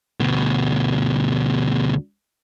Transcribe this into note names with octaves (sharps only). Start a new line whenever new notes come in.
D2 B2